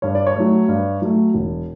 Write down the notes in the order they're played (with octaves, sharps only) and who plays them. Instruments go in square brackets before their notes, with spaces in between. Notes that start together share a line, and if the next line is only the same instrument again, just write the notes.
[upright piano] G2 C#5
D5
C#5
F#3 A3
G2
F#3 A3
E1